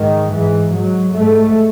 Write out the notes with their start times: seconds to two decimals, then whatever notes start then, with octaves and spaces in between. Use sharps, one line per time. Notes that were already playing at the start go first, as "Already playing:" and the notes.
Already playing: G#2 D#3
0.30 G#2 E3
0.72 G#2 F#3
1.13 G#2 A3